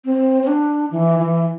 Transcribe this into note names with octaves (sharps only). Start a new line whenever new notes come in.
C4
C4
D4
E3
E3